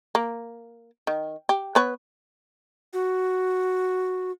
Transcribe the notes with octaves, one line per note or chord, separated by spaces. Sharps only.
A#3
D#3
G4
B3 B4 C#5
F#4